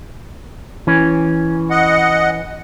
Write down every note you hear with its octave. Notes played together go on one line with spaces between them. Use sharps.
E3 C#4
D#5 F#5